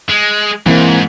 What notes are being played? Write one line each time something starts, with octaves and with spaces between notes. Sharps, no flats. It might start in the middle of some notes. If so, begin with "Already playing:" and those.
G#3
G#2 E3 A#3 C4